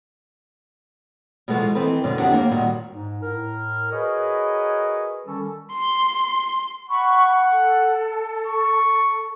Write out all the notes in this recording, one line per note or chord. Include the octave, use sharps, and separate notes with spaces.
B2 E3 F3 G#3 A3 B3
D#3 E3 C4 A4 B4
F#2 B2 D3
D#3 C4 D4 G4 F#5
D#2 A#3
A#2 D#3 G3 F4 F#4
G#2
A2 A#4
F#4 G#4 A#4 B4 C#5 D#5
D#3 G3 C#4 A4
C6
F#5 B5 C#6
A4
C#6